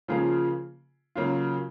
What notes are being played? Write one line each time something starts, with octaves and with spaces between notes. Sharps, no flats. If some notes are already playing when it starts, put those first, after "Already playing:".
C#3 F3 A#3 F4 G#4
C#3 F#3 A#3 F4